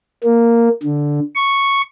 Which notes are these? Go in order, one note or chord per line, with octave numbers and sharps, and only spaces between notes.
A#3
D3
C#6